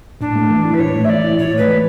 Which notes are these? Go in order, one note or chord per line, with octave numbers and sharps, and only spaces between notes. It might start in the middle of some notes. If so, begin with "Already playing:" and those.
A2 D4
A3
E3
E4
B4
A2 C#5
A3
E5
E3 D5
E4
A2 C#5
A3 B4
E3